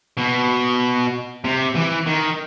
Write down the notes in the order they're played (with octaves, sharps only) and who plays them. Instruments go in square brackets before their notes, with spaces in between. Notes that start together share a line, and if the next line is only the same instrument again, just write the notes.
[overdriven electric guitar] B2
C3
E3
D#3